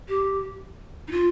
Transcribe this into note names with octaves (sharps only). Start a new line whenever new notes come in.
G4
D#4
F4